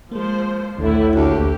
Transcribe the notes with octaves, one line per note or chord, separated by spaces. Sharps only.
F3 G#3 A#3 C5
A#1 D#2 A2 D3 A3 E4
D2 A#3 G4